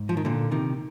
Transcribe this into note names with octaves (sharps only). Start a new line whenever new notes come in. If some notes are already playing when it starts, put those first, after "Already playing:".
Already playing: G#2
F3
D#3
A#2 D3
C3 D#3